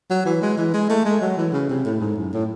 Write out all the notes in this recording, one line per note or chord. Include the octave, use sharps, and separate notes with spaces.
F#3
E3
G#3
E3
G#3
A3
G#3
F#3
E3
C#3
C3
A2
G#2
F#2
A2